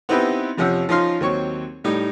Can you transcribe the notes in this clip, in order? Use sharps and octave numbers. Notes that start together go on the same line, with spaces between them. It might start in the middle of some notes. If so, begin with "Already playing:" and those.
B3 C4 D#4 E4 G4 B4
F2 C3 F3 C#4 F#5 E6
F3 C#4 D#4 F4 C6 F6
D#2 F#3 C4 C#5 C#6
A2 G3 D#4